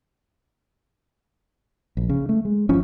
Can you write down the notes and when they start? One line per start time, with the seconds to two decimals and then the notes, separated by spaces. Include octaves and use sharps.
1.97 A#1
2.09 C#3
2.29 A3
2.45 G#3
2.69 G#1 F3 C#4